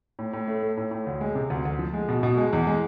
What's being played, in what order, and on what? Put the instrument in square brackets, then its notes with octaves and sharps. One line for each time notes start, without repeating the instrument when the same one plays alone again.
[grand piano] A2
A2
A3
A3
A2
A2
D2
G#3
C3
D2
D2
F3
G#3
B2
B2
G#3
E2
G#3